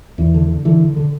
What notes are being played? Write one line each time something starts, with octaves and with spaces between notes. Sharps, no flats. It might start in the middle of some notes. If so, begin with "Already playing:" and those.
E2 E3
D3
D3
D3 E3
D3
D3